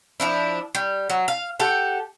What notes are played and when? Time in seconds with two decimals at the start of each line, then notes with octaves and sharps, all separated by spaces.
0.20 F3 D4 E4
0.75 G3
1.10 F#3
1.28 F5
1.59 G4 A4 F#5 G5